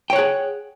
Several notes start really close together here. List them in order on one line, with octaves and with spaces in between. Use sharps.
G5 C#5 F#5 G#4